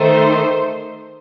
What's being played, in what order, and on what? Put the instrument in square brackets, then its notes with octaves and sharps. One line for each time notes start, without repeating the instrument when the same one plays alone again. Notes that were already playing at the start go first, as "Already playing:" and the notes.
Already playing: [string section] D#3 A3 D#4 C5